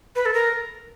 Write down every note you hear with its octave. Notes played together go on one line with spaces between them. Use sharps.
B4
A4
A#4